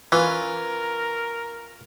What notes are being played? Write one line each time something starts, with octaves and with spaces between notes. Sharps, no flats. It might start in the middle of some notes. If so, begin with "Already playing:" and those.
E3 C#4 F4 A#4 B4